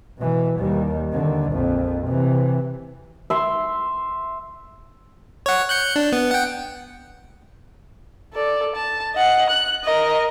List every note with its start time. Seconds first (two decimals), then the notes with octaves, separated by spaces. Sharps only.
0.18 B2 E3
0.57 D#2 G3
1.12 D#2 D3
1.51 A#1 F2
2.07 C3 E3
3.30 E5 C6
5.46 C#5 F#5
5.69 F#6 G6 C#7
5.96 D4
6.12 B3
6.31 F#5 G5
8.34 A4 D5
8.76 A5
9.14 D#5 F#5
9.50 F#6
9.85 A#4 D#5